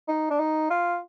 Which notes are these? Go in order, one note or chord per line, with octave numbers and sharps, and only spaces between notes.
D#4
D4
D#4
F4